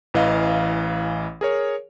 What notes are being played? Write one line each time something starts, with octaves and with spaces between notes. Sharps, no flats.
A1 E3 D#5 F5
G#4 A#4 C#5